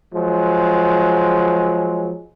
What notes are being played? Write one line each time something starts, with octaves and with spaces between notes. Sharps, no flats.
F3 F#3 G#3